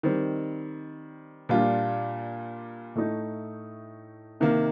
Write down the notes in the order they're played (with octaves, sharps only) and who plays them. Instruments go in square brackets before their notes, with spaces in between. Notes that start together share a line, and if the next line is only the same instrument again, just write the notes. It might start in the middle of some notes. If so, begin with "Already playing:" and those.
[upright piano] D#3 G3 C4
A#2 G3 D4 F4
A2 A3 D#4
C3 D#3 A#3